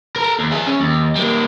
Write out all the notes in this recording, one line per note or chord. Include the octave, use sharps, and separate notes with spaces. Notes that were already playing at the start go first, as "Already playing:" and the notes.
A4 A#4
D#2
G#4 E5
C#4
D#2
G3 A#3